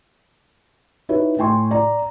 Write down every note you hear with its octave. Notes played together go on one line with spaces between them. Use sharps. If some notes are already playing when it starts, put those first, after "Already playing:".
D#4 E4 F#4 B4 C#5 E5
A2 G5 G#5 C6 C#6
D5 A#5